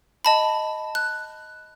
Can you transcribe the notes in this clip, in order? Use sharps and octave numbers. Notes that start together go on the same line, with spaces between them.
D#5 A5 B5
F#6